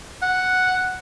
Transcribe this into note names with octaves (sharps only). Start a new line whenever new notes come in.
F#5